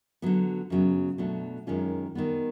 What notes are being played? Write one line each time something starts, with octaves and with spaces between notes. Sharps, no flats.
D3 F#3 B3
F#2 C#3 F#3 B3
B2 F#3 A3 D4
F#2 D#3 G#3 C#4 F4
D#3 G3 B3